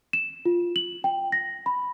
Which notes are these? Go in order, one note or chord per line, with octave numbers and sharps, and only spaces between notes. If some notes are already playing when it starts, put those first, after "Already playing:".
E7
F4
F#7
G5
A#6
B5